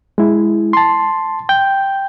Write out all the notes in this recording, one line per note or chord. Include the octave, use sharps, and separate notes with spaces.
G#3 E4
A5 C6
G5 G6